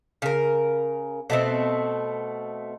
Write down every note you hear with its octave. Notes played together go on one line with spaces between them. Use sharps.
C#3 A#4
B2 A3 B3 C4